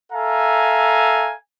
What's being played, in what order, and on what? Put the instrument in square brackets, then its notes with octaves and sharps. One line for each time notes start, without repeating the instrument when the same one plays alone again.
[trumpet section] A4 E5 F5 G#5 A#5